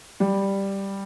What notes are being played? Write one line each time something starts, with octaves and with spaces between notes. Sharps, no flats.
G3